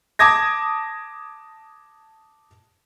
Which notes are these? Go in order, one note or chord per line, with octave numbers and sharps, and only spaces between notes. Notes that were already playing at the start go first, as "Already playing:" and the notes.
A5 D6 D#6 G#6 A#6